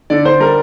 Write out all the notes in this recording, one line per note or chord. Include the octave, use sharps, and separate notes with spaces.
D3 D5
D3 C5
G3 A#4